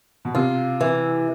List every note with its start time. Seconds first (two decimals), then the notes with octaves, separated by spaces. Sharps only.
0.25 B2
0.35 C3 F4
0.81 E3